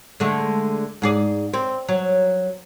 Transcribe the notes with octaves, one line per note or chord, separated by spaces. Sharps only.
D3 G#3 A3
G#2 G#4 D5
C4
F#3